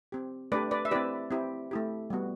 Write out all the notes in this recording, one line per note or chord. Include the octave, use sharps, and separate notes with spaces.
C4 G4
A3 D4 G4 B4 D5
B4 D5
E5
C4 E4 G4 B4 D5
C4 E4 G4
A3 E4 G4
G3 B3 F#4